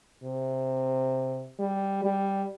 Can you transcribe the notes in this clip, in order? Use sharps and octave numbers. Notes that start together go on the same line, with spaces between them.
C3
G3
G3